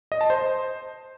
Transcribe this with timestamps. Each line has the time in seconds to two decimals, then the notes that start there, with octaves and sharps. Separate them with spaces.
0.12 D#5
0.21 A5
0.30 C5